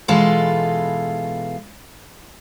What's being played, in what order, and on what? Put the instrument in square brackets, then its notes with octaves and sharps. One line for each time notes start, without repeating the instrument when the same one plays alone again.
[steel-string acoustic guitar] B2 E3 G#3 F4 A4